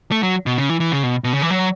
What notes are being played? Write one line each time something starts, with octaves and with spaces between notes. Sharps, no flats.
A3
F#3
B2
C#3
E3
E3
C#3
B2
B2
C#3
E3
F#3